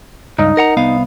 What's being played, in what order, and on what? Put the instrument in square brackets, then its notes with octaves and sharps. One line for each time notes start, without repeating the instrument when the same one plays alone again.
[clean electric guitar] C#2 G2 [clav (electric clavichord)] D#4
[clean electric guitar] A#4 F#5 A#5
C2 B3 F5